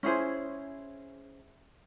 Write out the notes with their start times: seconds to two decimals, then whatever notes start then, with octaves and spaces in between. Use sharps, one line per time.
0.03 C#4 E4 G#4 C5